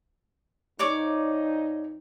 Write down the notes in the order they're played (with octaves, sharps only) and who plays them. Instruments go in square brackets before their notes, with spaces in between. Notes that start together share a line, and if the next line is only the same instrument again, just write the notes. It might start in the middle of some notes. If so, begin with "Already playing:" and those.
[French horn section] F2 D#4 [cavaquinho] C#5 D5 D6